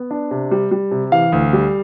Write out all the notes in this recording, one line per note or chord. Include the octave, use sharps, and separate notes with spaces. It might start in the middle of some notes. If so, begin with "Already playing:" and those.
Already playing: B3
D4
C3
G3
G3
C3
E3 F5
D2
G3